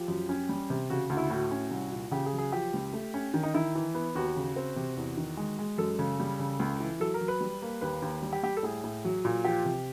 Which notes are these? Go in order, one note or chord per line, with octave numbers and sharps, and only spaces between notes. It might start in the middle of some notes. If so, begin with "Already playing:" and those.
Already playing: F3 G4
F#2
C#4
G3
C3
C#3 F#4
D2
E4
A2 F#4
C#4
C2
A#2
C#3 G4
G#4
F#3
G#4
F3 G4
C#2
A3
C#4
D#3
D#4
D#3 E4
E3
B3
D#2 F#4
C#3
C4
C3
E2
D#3
G#3
G#3
F#2 A4
C#3
G3
C#3
C#2
E3
F#3 A4
A#4
F#3
B4
G3
A#3
D#2 B4
D#2
G3
G4
G3 G4
A4
A2 G#4
A2
F#3
A#2
F3 G4
C3